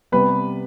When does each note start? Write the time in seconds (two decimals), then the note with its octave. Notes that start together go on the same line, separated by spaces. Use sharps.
0.12 C3 G3 B3 B4 B5